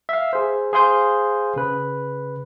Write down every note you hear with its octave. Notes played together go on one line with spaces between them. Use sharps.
E5 F5
G#4 C5
G#4 C5 F5 C6 D#6 G6
C#3 B4